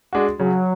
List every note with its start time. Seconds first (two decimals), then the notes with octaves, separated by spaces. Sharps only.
0.13 G#3 D4 F#4
0.39 C#3 F#3